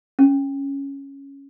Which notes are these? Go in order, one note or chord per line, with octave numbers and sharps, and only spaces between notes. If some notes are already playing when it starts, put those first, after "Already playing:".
C#4